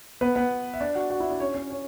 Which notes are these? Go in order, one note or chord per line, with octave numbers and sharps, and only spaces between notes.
B3 B4
B3 B4
E5
D4 D5
F#4 F#5
F#4 F#5
E4 E5
D4 D5
C#4 C#5
C#4 C#5
C#4 C#5